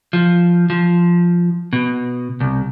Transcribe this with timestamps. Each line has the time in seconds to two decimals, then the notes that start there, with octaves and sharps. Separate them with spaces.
0.13 F3
0.70 F3
1.73 B2
2.40 C2